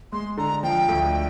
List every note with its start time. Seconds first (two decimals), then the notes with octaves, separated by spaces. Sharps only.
0.12 G#3 C6
0.37 D3 A#5
0.63 F3 G5
0.89 D2